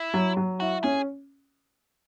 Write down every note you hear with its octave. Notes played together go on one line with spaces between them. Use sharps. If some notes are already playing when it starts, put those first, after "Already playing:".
Already playing: E4
F#3
F#3
E4 F#4
C#4 G#4